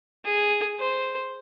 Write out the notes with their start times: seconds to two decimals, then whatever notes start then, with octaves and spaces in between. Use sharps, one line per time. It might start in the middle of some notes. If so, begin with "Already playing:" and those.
0.25 G#4
0.80 C5